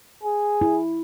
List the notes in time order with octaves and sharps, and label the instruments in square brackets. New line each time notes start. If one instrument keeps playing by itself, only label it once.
[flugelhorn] G#4
[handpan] E4